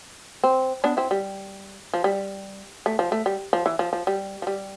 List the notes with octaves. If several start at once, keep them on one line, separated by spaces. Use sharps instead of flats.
C4
B3 D4
C4 E4
G3
F3
G3
A3
F3
A3
G3
F3
E3
F3
F3
G3
F3
G3